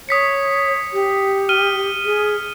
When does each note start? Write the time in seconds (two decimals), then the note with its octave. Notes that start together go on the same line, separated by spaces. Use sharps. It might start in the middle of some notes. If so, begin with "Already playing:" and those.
0.09 C#5 D#6 B6 C#7
0.93 G4
1.49 F6 D#7 G7
2.05 G#4